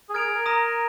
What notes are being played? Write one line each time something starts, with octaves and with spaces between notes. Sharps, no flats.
G#4
A#4 F6 G#6 D7 F7
G#4
A#4
A#5 D#6 A#6 D#7